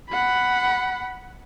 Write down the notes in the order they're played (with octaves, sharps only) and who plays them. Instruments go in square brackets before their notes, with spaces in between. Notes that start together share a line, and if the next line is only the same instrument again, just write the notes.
[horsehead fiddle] F#5 B5